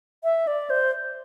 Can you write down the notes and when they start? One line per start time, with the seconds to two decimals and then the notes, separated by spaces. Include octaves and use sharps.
0.24 E5
0.47 D5
0.70 C5